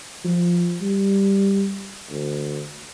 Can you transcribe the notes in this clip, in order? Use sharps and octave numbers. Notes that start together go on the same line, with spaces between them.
F3
G3
D2